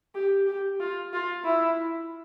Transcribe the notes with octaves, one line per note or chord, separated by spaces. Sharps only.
G4
G4
F4
F4
E4